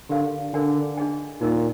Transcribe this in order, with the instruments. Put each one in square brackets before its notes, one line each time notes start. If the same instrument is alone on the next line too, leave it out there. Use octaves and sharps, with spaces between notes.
[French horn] D3 [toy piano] G4 A#4 F5
[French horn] D3 [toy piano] A#4 D5 G#5
[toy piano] D4 G#4 D#5 G#5
[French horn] A#2 [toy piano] D#4 A#4 D#5